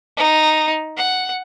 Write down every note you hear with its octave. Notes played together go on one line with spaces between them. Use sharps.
D#4
F#5